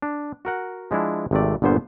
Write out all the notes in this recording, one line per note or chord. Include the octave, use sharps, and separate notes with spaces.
D4
F#4 A#4 F#5
F3 G#3 D4 E4
G#1 C3 A3 D5
G1 A#2 D3 B3 C5